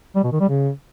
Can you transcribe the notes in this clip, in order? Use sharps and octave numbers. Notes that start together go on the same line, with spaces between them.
G3
B2
D#3
G3
C#3